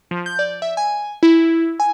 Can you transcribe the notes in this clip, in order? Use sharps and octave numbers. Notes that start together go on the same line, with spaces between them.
F3
G6
D5
E5
G#5
E4
G#5